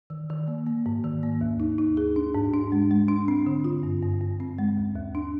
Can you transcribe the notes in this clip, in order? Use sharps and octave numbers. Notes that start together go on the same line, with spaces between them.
D#3
D#3
A#3
A#3
G#2
D#3
A#3
D#2
D#4
D#4
G#4
D4
G#2
D4
G#3
G#3
D4
C4
D3
F4
G2
G2
G2
C4
G#3
D#2
D#2
D4